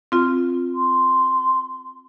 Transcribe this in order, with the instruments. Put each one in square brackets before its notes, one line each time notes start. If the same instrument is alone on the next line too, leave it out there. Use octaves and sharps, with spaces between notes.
[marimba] C4 F4
[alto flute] C6